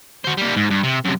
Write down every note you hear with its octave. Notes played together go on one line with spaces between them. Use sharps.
F#4 C5
G3 A#3
G#2
G2
C3
F#2 C3